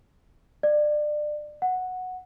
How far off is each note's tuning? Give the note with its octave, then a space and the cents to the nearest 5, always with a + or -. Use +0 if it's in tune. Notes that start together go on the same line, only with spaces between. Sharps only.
D5 +25
F#5 -5